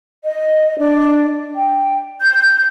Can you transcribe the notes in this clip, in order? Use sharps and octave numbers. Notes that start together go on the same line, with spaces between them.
D#5
D4
G5
G6